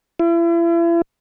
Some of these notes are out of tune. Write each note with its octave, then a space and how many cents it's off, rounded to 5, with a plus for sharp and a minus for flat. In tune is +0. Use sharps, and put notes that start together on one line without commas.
E4 +40